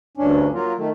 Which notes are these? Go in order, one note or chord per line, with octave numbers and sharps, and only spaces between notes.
D2 G2 C#4 D4
F#3 A#3 F4
D#3 A3